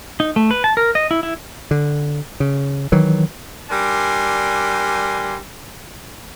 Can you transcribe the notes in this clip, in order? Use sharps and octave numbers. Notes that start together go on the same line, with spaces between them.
D#4
A3
B4
A5
A#4
D#5
E4
E4
D3
C#3
D#3 E3 F#3
G3 D4 A#4 G#5 C6